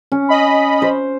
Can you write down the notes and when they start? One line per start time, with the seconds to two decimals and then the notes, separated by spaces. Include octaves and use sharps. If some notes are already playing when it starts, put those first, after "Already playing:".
0.12 C#4
0.29 D#5 B5
0.82 C5